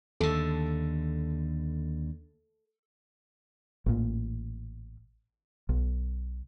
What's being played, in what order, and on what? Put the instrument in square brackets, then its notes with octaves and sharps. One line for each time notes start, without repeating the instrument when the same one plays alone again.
[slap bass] D#2 D3 [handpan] A4
[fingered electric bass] A1 A#2
B1